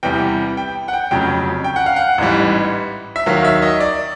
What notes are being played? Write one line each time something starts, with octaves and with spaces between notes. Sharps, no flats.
E2 C3 E3 G3 G5
G5
F#5
G5
F1 F2 C#3 F#3 G5
G5
F#5
F5
F#5
A1 G#2 E3 G3
E5
D#2 D#3 F#3 F5
E5
D#5
D5